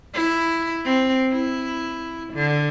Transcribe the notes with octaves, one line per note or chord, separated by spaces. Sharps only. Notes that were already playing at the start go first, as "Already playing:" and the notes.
E4
C4
E4
D3